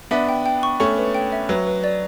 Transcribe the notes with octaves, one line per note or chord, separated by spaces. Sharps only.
B3 D4 E5
G5
G5
C#6
A3 C#4 C#6
B4
G5
E5
F#3 B4
B4
D5